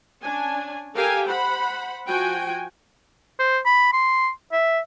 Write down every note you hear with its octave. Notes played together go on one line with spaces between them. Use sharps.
C#4 D4 G#5
G4 A4 A#4 F5 G5 G#5
C5 F#5 B5
F3 F#4 G5 G#5
C5
B5
C6
E5